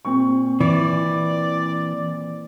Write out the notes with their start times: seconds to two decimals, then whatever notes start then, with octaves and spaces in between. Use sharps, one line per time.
0.05 A#2 C4 C#6
0.61 E3 D5